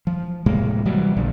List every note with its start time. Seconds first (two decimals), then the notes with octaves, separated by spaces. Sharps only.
0.07 F3
0.46 A2 C3 G#3 A#3
0.85 C3 E3 F#3 G3
1.17 A#1 A#2 D3